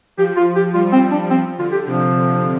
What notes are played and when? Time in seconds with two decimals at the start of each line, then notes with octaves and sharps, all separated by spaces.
0.18 F3 G4
0.37 F4
0.56 G4
0.74 G3 F4
0.93 C4
1.11 D4
1.31 F3 C4
1.58 D3 F4
1.72 G4
1.86 C3 F3